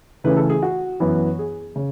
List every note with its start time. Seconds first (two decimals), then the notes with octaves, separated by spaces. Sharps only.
0.24 C#3 E3 A3 C#4 E4 B4
0.37 A4
0.50 G#4
0.63 F#4
1.00 F#2 E3 B3
1.39 G#4
1.76 C#3